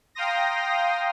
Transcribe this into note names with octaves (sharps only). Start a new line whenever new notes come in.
F5 G5 A#5 C6 D#6 A#6